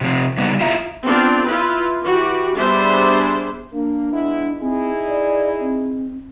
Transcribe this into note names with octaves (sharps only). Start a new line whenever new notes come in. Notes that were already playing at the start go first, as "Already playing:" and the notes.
C3 F3 C4
C#3 G3 B3 D#4
E4 F4 E5 A#5
B3 C4 D4 F4
E4 F4 B4
E3 F#4 G4
G3 B3 D4 G#4 C5 E5
A#3 D4
G#3 B3 E4
C4 D#4 E4 G#4
D5
C4